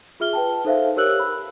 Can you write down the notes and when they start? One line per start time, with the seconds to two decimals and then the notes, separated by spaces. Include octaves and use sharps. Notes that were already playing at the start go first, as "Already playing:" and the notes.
0.20 F4 G#4 E5 F6 G7
0.33 B4 G5 A5
0.65 D#4 A4 C5 E5 F5
0.96 G4 A#4 C#5 E6 F#6 F#7
1.19 B5